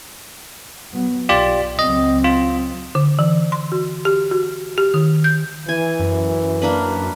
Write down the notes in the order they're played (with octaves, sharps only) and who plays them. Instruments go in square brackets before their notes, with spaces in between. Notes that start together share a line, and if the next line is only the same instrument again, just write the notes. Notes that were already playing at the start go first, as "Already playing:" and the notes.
[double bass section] F#3 B3
[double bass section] B1 [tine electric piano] F4 G4 D5
[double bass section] C#2 F#3 C4 [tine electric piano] D#5
[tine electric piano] F4
[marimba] D3
E3
C6
F#4
G4
F#4
G4
D#3
G6
[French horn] E3 [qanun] G#5
[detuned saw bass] F#2
[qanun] A#3 D4 B4